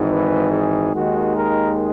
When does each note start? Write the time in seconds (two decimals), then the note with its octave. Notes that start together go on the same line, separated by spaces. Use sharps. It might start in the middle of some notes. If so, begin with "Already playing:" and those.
Already playing: G#1 G#2 E3
0.10 B4
0.52 G#4
0.93 D#2 D#3 G#3 F#4
1.36 A#4